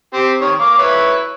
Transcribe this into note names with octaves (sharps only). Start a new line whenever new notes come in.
C4 G4
D#3 C#5
F5 D6
E4 B4 C#5